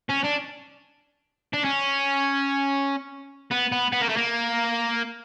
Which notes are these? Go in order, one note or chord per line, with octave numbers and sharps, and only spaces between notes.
C#4
D4
D4
C#4
B3
B3
B3
A#3
A3
A#3